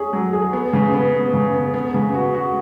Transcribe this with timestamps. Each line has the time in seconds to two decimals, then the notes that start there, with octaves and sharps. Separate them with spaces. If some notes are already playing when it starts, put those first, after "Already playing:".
Already playing: C#4 G#4
0.13 F#3
0.33 G#4
0.53 B3
0.73 C#3
0.93 B3
1.14 B3
1.33 C#3
1.54 B3
1.74 B3
1.94 C#3
2.14 F#4
2.34 F#4